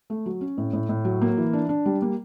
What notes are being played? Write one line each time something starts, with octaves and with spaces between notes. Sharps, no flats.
A3
F#3
C#4
A2
A2
A2
F#3
A#3
E3
D4
D4
G3
A#3